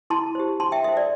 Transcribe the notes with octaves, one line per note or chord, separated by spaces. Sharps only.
E4 A5 C6
G4 C5
D4 A5 C6
E5 G5
A4 C5 E5
D5